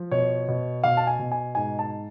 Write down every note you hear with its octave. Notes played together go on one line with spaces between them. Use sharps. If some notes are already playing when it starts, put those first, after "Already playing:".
Already playing: F3
B2 C#5
B2
B2 F5
A5
G#5
B2
G#5
G#2 G#5
A5